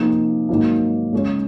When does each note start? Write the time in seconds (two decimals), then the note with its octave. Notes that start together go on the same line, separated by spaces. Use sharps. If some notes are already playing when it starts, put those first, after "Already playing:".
Already playing: C3 F3 A#3 D#4 G#4
0.49 G#2 D#3 F#3 A#3
1.13 C#3 G#3 C#4 G#4 C#5